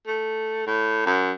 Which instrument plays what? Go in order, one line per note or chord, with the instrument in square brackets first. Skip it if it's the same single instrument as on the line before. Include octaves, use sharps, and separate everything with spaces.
[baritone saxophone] A3
A2
F#2